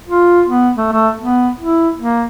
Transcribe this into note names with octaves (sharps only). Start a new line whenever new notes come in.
F4
B3
A3
A3
B3
E4
A#3